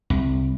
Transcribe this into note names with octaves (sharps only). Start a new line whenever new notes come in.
C2